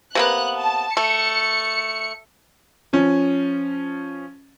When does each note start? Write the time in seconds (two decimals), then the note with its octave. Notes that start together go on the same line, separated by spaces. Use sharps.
0.15 C3 A#3 B3 F#6
0.57 A5
0.97 A3 C#7
2.93 F3 C#4